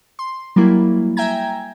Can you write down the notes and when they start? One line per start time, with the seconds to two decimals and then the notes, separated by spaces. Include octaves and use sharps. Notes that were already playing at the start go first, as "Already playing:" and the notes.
0.19 C6
0.56 F#3 G3 A#3 E4
1.17 E5 G5 G#5 A#5 G#6